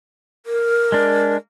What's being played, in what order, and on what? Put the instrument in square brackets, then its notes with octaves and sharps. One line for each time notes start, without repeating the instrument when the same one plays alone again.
[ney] A#4
[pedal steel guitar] G#3 D4